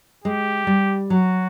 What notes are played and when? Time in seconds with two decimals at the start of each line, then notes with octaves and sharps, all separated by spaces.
0.24 G#3 G4
0.67 G3
1.10 F#3 F#4